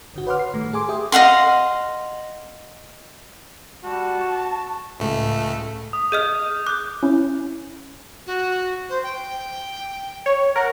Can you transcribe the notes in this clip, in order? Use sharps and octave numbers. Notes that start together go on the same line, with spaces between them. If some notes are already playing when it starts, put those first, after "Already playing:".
G#1 D3 F#4
B4 C#5 F#5 C6 D6 F6
C7
A2 D#3 G3 A3
G#4 A4 G#5 C6 D6
G4 G#4 E5 G5 D#6
D#5 F5 F#5 C6
G3 F#4 A5
C#6
C#2 A2 A3
D#6
G#4 D#5 F6 G6
D6 F#6 G6
C#4 E4
F#4
C5
G5
C#5
A#4 F#5